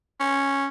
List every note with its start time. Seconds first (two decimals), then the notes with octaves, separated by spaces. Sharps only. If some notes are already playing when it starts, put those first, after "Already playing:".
0.20 C#4